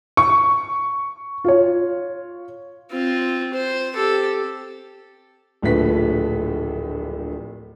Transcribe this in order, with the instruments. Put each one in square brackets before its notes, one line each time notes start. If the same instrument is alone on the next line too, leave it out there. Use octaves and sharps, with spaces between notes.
[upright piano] C#6
F4 C#5
[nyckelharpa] C4 F4
C5
G4 A4
[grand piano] D1 A#1 F3 A3 B4 B6